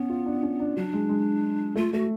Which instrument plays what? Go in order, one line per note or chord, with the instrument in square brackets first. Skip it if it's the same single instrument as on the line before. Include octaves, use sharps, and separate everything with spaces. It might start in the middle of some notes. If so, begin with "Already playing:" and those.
Already playing: [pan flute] B3 [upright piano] C#4
[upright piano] F4
D4
C#4
D4
[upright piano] F#3 [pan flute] D4
[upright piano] G#3
G#3
[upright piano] A3 [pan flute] F4
[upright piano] A3 [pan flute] F#4